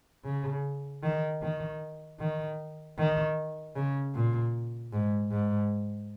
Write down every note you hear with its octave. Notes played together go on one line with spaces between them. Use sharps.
C#3
D#3
D#3
D#3
D#3
C#3
A#2
G#2
G#2